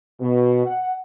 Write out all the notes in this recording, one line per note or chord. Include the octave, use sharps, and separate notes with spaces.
B2
F#5